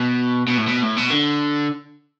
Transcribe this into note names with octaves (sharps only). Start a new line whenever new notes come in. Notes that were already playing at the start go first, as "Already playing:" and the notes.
Already playing: B2
B2
A2
B2
A2
B2
D3